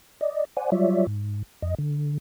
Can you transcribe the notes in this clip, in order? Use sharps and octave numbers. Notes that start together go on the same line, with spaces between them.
D5 D#5
C5 D5 F#5 G#5
F#3 G3 F4 C#5 D5 E5
G#2
F2 D#5
D3